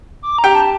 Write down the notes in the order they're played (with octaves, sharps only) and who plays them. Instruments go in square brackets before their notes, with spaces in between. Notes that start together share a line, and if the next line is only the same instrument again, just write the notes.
[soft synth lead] D6
A#5
[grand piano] G4 G5
[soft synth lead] A5